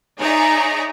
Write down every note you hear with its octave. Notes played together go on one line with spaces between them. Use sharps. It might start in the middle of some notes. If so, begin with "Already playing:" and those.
D#4 G#4 C#5 D5 E5 A#5